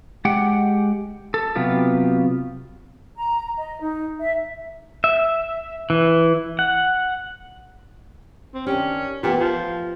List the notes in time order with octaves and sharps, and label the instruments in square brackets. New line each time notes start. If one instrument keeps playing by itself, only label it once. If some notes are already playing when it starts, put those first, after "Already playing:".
[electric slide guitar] G#3 G4 F#5 G5
A4
C3 F#3 B3 F4 G4
[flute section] A#5
D#5
D#4
E5
[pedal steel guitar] E5
E3
F#5
[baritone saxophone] C4
[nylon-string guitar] D#3 D4 G4 [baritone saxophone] C#4
[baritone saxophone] A#2 [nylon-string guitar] E3 B3 G4
[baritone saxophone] F3 [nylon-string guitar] A3